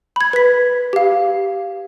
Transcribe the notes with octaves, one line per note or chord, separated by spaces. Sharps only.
B5 G#6
B4 B6
G4 F5